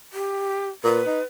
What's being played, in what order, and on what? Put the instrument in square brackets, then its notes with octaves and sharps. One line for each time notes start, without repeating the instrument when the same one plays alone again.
[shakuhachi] G4
[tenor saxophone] A#2 [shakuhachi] B4
[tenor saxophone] D#4